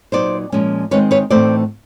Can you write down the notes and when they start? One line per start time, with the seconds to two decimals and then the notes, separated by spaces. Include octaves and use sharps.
0.12 A#2 F#3 B3 D#4 C5 D5
0.52 A#2 F3 G#3 C#4
0.91 D#3 G#3 C4 D#4 B4 C#5
1.11 B4 C#5
1.30 A2 E3 A3 C4 D#4 C5 D5